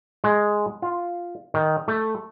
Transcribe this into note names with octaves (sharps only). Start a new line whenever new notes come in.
G#3
F4
D#3
A3